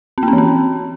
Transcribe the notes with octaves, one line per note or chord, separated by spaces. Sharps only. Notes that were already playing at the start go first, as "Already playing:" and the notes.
C4
A#3
C#4
E3
C4